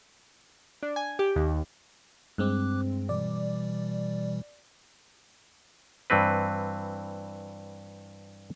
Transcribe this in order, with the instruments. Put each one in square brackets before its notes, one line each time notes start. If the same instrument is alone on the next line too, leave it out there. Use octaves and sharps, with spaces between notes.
[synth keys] D4
G#5
G4
D#2
[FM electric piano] G2 G#3 C4 [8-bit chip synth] D6 F#6
[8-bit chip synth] B2 E3 G3 [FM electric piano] D5
[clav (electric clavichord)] G2 E3 C4 B4